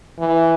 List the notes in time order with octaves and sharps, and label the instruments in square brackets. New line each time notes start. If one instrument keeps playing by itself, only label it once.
[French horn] E3